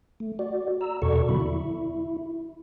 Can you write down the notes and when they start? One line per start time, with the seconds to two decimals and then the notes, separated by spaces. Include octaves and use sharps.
0.20 A3
0.39 F#4 D5
0.81 A#5 E6
1.02 E2 B2 F#4 A4 D5 C#6
1.29 D3 F#3 B3 E4 B5
1.40 E4